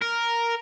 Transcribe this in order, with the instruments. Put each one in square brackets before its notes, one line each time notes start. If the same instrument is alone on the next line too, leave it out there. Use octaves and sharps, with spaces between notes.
[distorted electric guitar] A#4